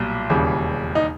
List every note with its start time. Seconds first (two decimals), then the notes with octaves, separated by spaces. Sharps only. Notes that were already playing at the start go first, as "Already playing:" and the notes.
Already playing: B1 A#2 G3
0.30 E1 D#2 C#3 E3 G3
0.95 D#4